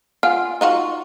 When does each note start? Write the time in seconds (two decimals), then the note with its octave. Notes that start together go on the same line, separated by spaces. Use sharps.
0.23 F4 F#5 G#5 F6
0.61 D#4 F4 F#4